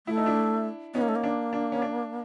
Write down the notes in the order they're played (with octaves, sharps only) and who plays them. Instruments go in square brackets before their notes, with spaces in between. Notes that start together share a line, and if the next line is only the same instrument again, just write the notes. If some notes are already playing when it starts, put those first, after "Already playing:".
[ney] A3 [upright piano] E4
[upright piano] D#4
D4 E4
[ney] B3 [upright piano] C#4 D#4
[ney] A#3
A3
A#3
[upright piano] D4
D4
C#4
D4